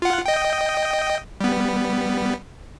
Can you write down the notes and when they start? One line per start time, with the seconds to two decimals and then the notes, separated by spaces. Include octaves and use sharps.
0.02 F4 F#5
0.26 D#5 G5
1.41 G3 B3